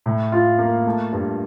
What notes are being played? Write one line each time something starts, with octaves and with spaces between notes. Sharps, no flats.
A2
F4
A#3
A3
G2